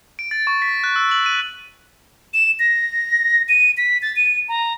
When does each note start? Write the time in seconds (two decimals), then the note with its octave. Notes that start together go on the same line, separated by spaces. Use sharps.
0.19 D7
0.31 A6
0.47 C#6
0.62 B6
0.84 F#6
0.96 E6
1.11 F#7
1.26 D#7
2.34 E7
2.59 A#6
3.49 D#7
3.77 B6
4.02 A6
4.16 D#7
4.48 A#5